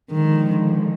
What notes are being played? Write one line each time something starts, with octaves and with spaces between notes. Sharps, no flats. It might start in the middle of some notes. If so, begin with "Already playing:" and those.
D3 D#3 F3 G#3